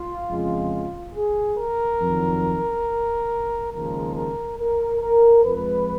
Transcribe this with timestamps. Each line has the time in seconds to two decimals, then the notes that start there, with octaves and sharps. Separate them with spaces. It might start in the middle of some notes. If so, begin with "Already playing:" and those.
Already playing: F4
0.29 F2 C#3 G#3
1.15 G#4
1.57 A#4
2.01 F2 D#3 F#3
3.72 D#2 C#3 F3 G#3 A#4
4.15 A#4
4.58 A#4
5.02 A#4
5.44 F2 F3 G#3 B4